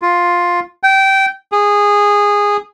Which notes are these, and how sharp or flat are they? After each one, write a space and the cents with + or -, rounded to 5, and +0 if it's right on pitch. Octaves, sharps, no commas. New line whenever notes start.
F4 +5
G5 -20
G#4 -15